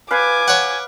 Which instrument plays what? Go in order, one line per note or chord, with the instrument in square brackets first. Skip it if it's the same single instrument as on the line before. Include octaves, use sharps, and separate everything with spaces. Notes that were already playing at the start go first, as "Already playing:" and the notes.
[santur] B4 F5 [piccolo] G#5 [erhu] D6
[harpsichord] C#5 F#5